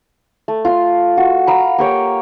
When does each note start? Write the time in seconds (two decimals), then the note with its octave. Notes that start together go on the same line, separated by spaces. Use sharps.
0.48 A3
0.65 F4 C6
1.17 F#4
1.47 F5 A#5 B5
1.78 A#3 G4 C#5 G5